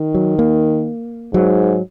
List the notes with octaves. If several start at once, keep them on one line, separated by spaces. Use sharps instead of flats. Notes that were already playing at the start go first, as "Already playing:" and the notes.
Already playing: D#3
F#3
A#3
G#2 F#3